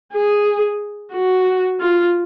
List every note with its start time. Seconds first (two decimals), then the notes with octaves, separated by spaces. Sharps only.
0.13 G#4
1.13 F#4
1.80 F4